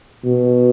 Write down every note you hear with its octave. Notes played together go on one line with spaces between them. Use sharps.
B2